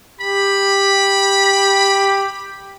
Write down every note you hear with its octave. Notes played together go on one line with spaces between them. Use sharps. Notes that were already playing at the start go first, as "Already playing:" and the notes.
G4 B5